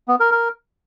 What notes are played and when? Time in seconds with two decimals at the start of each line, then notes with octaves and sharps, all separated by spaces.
0.08 B3
0.20 A#4
0.32 A#4